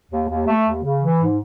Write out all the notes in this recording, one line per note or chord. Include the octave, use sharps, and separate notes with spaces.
D#2
D#2
A3
D#2
C#3
E3
G#2